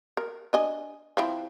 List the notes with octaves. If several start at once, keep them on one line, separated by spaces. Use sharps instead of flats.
A#4
D4 D#5 G#5
F3 C4 E4